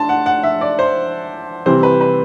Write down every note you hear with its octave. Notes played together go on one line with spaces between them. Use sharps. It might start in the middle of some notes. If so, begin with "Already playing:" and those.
Already playing: D4 A5 C6
F#5
F#5
E5
D5
C5
C3 E3 G3 C4 C5
B4
B4